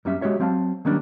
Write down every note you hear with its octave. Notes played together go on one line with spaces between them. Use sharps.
F#2 G3 C#4 E5
G#3 F#4 G4 C#5 E5
F#3 C4 F5 G5 A5
D#3 F#3 G3 A#3 C#4 D4